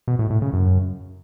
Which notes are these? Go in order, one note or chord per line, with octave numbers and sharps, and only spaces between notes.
B2
A2
A2
C#3
F#2